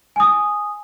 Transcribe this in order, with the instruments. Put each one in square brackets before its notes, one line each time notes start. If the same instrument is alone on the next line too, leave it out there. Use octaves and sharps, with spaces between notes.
[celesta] G#5 D#6